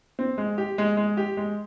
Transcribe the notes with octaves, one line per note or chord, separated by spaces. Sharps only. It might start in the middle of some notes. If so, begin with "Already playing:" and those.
C4
G#3
G4
G#3
G#3
G4
G#3